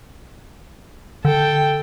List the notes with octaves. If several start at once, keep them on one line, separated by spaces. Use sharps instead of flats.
D3 A4 G5